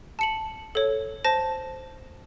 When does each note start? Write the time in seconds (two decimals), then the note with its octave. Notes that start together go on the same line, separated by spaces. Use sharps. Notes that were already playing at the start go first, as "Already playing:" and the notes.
0.19 A5 C#7 F#7
0.75 A4 C#5
1.25 C5 A5 A#6